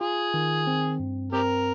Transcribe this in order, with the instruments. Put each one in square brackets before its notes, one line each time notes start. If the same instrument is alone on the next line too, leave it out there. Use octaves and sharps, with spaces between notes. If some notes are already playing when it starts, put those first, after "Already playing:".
[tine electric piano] F4 [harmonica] G#4
[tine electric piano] D#3
C4
G2
[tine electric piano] C4 [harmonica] G4 A#4